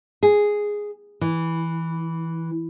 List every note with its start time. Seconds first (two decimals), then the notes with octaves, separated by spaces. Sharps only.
0.23 G#4
1.21 E3